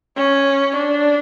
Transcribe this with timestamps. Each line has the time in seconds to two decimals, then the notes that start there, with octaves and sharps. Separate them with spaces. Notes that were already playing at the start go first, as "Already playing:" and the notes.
0.17 C#4
0.76 D4